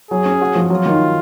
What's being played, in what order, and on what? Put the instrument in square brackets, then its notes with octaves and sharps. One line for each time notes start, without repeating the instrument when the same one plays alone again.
[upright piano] F#3 [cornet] G#4
[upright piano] C#4
F#4
F3
[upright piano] F#3 [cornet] F4
[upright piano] D#3